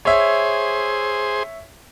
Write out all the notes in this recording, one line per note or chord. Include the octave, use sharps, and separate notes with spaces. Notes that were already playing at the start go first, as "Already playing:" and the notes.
G#4 C5 C#5 E5